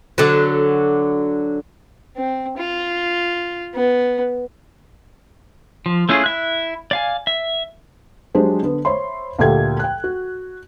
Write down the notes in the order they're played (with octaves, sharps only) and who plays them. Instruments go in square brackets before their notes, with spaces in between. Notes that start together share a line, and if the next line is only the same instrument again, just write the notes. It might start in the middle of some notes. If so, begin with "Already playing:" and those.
[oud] D3 F#3
[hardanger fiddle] C4
F4
B3
[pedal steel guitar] F3
A3 C#4 E4 F4 G#4
E4 E5 F#6
D5 F5 G#5
E5
[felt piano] F#3 G#3 D4 G4 G#4 C5
D3 B3
C5 C#5 E5 B5 C6
D2 A#2 A3 G4 G5 G#6
G5 F#6
F#4